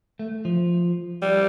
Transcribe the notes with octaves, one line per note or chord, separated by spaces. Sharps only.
A3
F3
G3